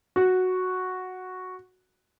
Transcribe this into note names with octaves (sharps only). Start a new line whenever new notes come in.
F#4